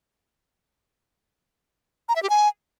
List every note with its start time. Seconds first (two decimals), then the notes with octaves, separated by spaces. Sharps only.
2.09 A#5
2.16 E5
2.23 G4
2.30 G#5